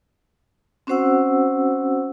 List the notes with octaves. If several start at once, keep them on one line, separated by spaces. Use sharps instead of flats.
C4 C#4 F#4 C5 F#5 E6